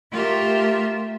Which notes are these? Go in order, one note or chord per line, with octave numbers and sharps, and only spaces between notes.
A3 F4 G4 A#4 E5